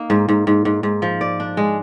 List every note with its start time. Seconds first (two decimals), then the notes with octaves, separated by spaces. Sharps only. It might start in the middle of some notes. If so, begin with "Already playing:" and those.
Already playing: A#3 D#4
0.10 G#2
0.29 G#2
0.47 G#2
0.65 G#2
0.83 G#2
1.02 F3
1.21 D5
1.40 D4
1.57 G#3